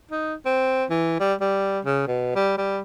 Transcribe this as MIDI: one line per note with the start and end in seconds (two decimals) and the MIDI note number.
0.11 0.35 63
0.45 0.85 60
0.90 1.16 52
1.20 1.34 55
1.41 1.79 55
1.85 2.04 49
2.07 2.34 47
2.35 2.58 55
2.58 2.80 55